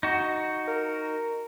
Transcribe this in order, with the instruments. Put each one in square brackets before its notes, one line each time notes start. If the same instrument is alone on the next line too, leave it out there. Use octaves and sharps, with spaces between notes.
[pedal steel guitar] D#4 F#4
[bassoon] A#4